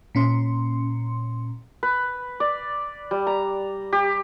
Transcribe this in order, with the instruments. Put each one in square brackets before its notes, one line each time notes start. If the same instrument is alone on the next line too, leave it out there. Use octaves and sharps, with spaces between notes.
[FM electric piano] A#2 C#4 C6
[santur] B4
D5
G3
A#5
G4